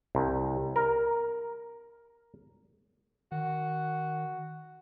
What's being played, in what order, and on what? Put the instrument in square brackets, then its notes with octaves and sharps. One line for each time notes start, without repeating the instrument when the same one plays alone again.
[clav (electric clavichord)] C2
A#4
[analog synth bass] D#3 [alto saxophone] F#4